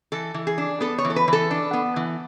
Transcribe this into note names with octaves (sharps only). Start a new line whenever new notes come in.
E3 A4
E3
G#4
D4
B3 A4
C#5
E3
A4
B4
E3 A4
D4
B3
E3